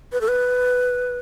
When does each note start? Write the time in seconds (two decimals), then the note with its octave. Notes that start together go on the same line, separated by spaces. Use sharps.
0.12 B4
0.21 A4
0.28 B4